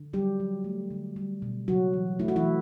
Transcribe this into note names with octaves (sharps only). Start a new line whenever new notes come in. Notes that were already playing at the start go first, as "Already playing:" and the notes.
Already playing: D3
F#3 G3 G4
F#3
A3
D3
G3
B2
C#3 F#3 F#4
E3
A3 E4
F#4
E3 E4
A3